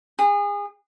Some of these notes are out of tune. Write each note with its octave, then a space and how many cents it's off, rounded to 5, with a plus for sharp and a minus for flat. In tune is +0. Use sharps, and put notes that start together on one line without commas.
G#4 -30